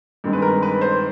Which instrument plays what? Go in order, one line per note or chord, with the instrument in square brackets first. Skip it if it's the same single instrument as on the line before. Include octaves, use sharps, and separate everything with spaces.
[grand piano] G2 D#3 G#3 C4
B4
A#4
B4
C5